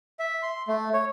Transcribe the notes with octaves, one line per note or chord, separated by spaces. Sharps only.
E5
C6
A3
C#5